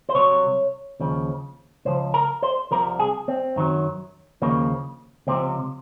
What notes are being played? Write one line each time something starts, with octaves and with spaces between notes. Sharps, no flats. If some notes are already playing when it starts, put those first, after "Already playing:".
C5
C2 C3 F#3 C#5
D#2 C#3 F3
C#2 C#3 F3 C5
A#4
C5
C2 C3 F3 A#4
G#4
C4
F#2 D#3 F#3
D#2 C#3 F3 A#3
C#2 C3 F3 C4